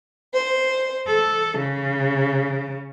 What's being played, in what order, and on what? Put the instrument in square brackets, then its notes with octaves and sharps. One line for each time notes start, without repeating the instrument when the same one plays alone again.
[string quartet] C5
A4
C#3